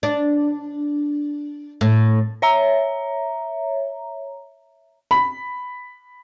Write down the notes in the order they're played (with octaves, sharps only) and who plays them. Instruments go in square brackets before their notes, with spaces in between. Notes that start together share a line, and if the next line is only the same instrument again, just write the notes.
[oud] D4
A2
[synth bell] C#5 E5 A#5
[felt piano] B5